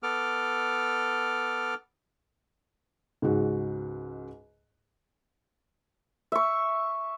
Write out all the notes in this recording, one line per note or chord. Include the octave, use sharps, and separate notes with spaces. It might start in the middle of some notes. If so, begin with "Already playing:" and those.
B3 A4 D6 F6
C#2 G#2 F#4
E5 C#6